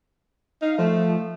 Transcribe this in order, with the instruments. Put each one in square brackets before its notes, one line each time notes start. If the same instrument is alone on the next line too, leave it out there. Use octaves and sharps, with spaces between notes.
[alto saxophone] D#4 [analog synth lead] F5
[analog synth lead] F3 [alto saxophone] A3